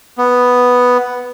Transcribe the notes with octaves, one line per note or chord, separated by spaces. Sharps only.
B3